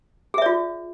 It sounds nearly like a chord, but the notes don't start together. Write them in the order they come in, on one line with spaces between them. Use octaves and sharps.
G#4 E5 D5 F4